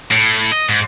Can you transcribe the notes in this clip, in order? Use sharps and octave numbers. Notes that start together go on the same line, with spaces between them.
A2
D#5
G#2